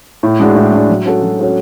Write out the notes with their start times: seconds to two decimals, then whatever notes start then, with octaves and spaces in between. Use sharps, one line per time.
0.23 A2
0.40 G#3 D4 F#4
0.56 A2
0.72 G#3 D4 F#4
0.89 F#3
1.05 C#4 F#4 A4
1.22 F#3
1.39 C#4 F#4 A4